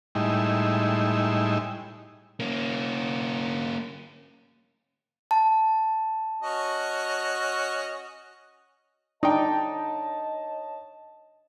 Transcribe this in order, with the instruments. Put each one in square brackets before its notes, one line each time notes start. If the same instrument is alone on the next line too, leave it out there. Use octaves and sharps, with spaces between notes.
[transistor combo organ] A2 G3 G#3 D#4 E4
[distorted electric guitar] A#3 C#4
[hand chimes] A5
[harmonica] C#4 F#4 D#5
[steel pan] D4 [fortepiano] D#4 G5 [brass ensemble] C#5 D#5 A5